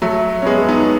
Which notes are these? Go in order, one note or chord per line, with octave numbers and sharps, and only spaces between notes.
F#3 A3
C#4
G#3 B3
B3 D#4